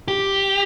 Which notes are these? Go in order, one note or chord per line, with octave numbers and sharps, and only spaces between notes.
G4